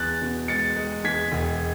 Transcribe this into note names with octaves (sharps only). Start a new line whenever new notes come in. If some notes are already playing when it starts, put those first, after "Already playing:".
Already playing: E2 F#6 A6
B2
G#3 A6 C#7
G#3
E2 G#6 B6
E1